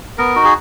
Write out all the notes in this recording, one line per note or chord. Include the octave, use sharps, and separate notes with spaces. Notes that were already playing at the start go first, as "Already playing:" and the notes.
B3 A#4
D#4 F#4
G#4